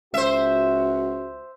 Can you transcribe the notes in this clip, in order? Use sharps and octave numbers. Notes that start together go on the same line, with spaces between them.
C#2 F#4 C5 E5